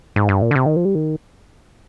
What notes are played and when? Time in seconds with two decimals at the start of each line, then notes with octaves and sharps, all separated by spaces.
0.16 G#2
0.29 G2
0.42 A#2
0.51 D3
0.56 C3
0.66 D#3
0.76 F3
0.85 G3
0.95 D#3